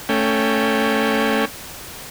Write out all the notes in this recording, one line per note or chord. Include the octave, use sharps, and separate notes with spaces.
A3 C#4 G5